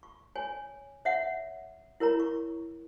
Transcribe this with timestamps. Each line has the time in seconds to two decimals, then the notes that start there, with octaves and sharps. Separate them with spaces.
0.03 C#6
0.36 C#5 G#5
1.05 C#5 E5 F#5
2.00 E4 A#4 C#5 A#5
2.20 C#6